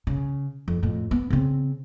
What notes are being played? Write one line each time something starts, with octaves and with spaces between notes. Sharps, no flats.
C#3
F2
F2 A2
B3
C#3 C4